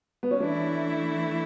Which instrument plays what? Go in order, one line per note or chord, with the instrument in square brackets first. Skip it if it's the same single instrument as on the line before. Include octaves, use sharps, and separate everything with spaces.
[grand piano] B3
C#4
[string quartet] E3 A3 E4 [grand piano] D4